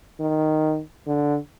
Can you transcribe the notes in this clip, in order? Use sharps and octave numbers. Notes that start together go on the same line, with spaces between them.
D#3
D3